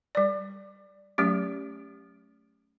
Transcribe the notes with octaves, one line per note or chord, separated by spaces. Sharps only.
G3 D5
F#3 A3 C#4 G4